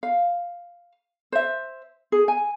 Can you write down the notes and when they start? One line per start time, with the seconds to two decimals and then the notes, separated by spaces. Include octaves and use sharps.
0.03 F5
1.32 C5 E5
2.12 G#4
2.28 G#5